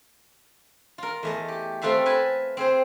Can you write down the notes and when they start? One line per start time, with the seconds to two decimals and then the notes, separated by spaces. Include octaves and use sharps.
0.98 F4 A#4
1.23 E2 A3 D#5
1.48 G4
1.82 A3 C4 F4 B4 E5 C6
2.06 B4 G#5 A5
2.57 C4 G#4 C5